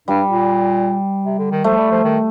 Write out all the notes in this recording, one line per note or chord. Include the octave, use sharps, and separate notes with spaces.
G2 G3
A#2
C3
D3
D#3
F3 A3
G3
F3
D#3